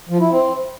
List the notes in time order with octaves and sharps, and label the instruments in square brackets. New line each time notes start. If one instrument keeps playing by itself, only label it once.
[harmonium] F3
E4
C4